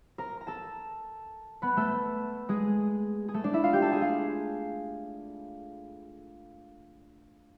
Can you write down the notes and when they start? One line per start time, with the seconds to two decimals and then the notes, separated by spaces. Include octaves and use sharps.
0.18 A#4 A#5
0.41 A#5
0.47 A4 A5
1.62 B3 B4
1.77 A3 A4
2.49 G#3 G#4
3.28 G#4
3.34 A3 A4
3.44 D4 D5
3.53 E4 E5
3.64 F4 F5
3.73 G4 G5
3.82 A4 A5
3.91 G#4 G#5
4.01 F4 F5